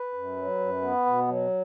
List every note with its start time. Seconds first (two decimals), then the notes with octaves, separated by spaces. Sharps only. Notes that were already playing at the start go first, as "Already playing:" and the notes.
Already playing: B4
0.13 F#2
0.37 F#3
0.59 F#2
0.82 B3
1.06 B2
1.28 F#3